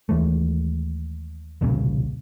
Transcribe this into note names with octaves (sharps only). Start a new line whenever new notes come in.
D#2 E3 G#3 A3
E1 C2 A#2 C#3